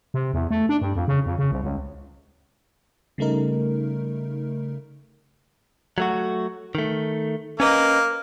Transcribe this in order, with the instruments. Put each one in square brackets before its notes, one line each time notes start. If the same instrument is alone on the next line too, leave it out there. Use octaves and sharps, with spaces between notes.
[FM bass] C3
E2
A3
D4
G2
F2
C#3
F2
C#3
C2
C#2
[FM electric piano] C#3 G3 A3 D#4 A#4
[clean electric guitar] F#3 A3 F#4
D#3 A3
[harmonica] A#3 [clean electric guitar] C#4 B4 D#5